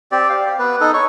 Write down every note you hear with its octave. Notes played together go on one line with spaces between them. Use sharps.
C4 G4 D5
F5
G4
B3 B4
D#4 A4
C#5 C#6